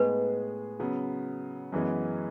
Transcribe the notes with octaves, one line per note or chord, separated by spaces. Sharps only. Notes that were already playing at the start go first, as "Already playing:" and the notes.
Already playing: A2 G#3 B3 D#4 G#4 B4
C#3 F#3 B3
F#2 E3 G#3 B3